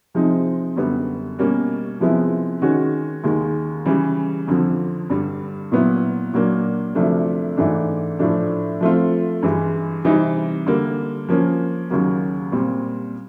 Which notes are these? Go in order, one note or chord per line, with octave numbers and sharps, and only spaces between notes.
C3 F3 G#3 C4 D#4
F#2 D3 G3 B3
B2 G3 A#3 C#4
C3 F3 G#3 B3 E4
D#3 G#3 C#4 F#4
D#2 D#3 G#3
C#3 E3 G3
F2 D3 F3
G2 D3 G3
A#2 F#3 B3 E4
A#2 F#3 A#3 D4
D2 C3 F3 A3 D4
G#2 E3 A3 D4
A2 F3 A3 D4
F3 A3 C4 F4
G2 E3 G#3
C3 E3 G3 C4 D#4
D3 G3 A#3
F3 A#3 C#4
D#2 C#3 F#3 A#3
A#2 G3 C4